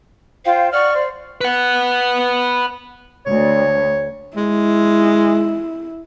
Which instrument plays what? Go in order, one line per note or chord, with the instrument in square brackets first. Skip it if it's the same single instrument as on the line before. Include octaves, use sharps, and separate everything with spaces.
[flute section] F4 C5 G5 [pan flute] F5
[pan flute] D5 [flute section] F#5 C#6 F6
[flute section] C5
[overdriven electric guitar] B4 F#5
[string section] D2 [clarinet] C#5
[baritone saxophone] G#3 [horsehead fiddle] E4